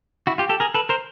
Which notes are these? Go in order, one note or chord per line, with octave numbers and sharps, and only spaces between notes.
E4 F#4
F4 G4
G4 A4
G#4 A#4
A4 B4
A#4 C5